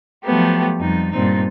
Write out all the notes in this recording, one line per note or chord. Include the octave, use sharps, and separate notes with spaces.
F3 F#3 A3 B3 G4
F2 G3 D#4
G2 A#2 C4 D#4